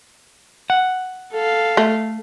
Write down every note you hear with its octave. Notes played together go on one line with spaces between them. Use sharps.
F#5
A4 F5
A3